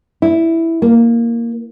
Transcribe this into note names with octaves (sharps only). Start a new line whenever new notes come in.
E4
A#3